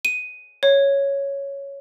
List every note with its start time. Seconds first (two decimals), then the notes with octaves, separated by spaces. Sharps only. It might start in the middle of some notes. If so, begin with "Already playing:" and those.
0.05 D#7
0.63 C#5